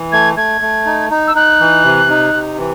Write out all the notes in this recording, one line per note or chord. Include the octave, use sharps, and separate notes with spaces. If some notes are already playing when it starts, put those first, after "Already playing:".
Already playing: E3
A3 G#6
A3 G#6
A3
D#4
D#4
E6
D#4 F#6
E3
C3
D#4
C3
E3